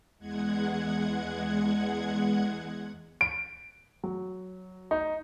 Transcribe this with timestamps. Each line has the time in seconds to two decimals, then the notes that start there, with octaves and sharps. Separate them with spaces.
0.19 E2 G#3 F#5 G#6
3.21 D7
4.04 F#3
4.91 D#4